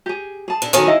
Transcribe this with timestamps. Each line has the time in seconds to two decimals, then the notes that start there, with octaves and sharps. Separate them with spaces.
0.06 G4 G#4
0.48 G#4 A5
0.62 D3
0.73 D#3 F#3 C#4 A4
0.87 E4 D#5 F5